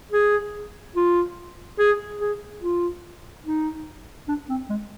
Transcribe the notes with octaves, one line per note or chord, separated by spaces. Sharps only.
G#4
F4
G#4
G#4
F4
D#4
D4
C4
G#3